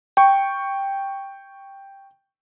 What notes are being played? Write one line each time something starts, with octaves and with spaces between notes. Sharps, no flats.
G5 C#6